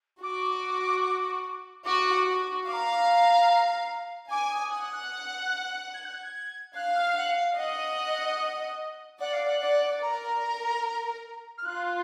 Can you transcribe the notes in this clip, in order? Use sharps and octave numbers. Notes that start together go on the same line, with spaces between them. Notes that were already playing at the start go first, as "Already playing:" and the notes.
F#4 D6
F#4 D6
F#4
F5 D6
A#5
G#5 D6
D#6
F#5 D#6
F#6
G#6
F#6
G#6
F5 F#6
F6
F#5
F5
D#5 F#5
D5 F#5
F5
F#5
D5
A#4 A#5
F6
F4 F#6